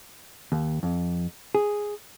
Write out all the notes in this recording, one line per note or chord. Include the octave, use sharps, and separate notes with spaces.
D#2
F2
G#4